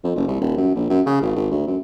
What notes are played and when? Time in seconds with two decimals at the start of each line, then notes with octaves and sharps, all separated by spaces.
0.04 F2
0.16 F#1
0.27 C2
0.41 D#1
0.57 F#2
0.75 A#1
0.90 F#2
1.06 C#3
1.21 G#1
1.36 G#1
1.51 D2
1.67 F#2